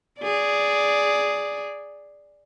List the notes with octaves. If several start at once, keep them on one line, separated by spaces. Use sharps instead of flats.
G#4 D5